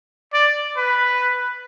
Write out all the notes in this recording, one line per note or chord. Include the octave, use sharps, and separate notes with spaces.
D5
B4